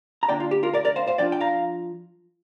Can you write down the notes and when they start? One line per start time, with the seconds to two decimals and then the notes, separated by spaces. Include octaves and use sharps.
0.23 A#5
0.29 D3 A#3 D4 F4 D5 G5
0.40 F4
0.51 G4
0.63 F4 A#4
0.73 A#4 D5
0.85 A#4 D5
0.96 C5 F5
1.08 C5 F5
1.18 F3 D4 F4 D5 G5
1.32 G5
1.41 F5 A#5